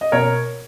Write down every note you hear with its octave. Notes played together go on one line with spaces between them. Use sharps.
D#5
B2 A#4 C#5